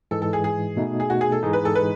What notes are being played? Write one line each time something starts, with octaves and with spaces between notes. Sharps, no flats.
G#2 E3 G#3 A4
A4
G#4
G#4
B2 A3 D#4
G#4
F#4
G#4
A4
G#2 E3 G#3 D#4 G#4
B4
A4
B4